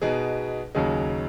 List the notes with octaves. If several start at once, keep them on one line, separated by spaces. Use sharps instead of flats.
B2 B3 D#4 G#4
D#2 C#3 F#3 D#4 G#4